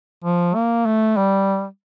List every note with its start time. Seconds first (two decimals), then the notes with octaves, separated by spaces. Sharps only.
0.24 F3
0.55 A#3
0.86 A3
1.17 G3